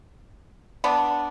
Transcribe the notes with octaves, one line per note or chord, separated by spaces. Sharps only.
B3 D4